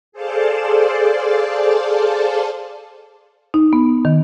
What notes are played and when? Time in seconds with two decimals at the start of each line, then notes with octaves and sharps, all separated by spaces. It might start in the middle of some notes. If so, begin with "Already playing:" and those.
0.12 G#4 A4 C5 D5 F5 A5
3.54 D#4
3.73 B3
4.05 D#3